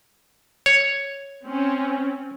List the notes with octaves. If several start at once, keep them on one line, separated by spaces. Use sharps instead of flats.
C#5
C4 C#4